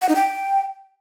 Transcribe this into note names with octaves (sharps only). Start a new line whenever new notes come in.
F#5
D#4
G5